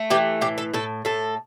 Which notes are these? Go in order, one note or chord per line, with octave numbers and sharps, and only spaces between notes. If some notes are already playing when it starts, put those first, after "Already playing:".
Already playing: A3
E3 G4
A2 G4
A4
A2 A4
A2 A4